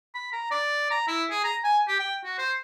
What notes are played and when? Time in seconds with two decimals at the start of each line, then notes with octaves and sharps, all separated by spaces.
0.15 B5
0.33 A#5
0.51 D5
0.91 A#5
1.07 E4
1.30 G#4
1.44 A#5
1.64 G#5
1.88 G4
1.99 G5
2.24 F#4
2.38 C5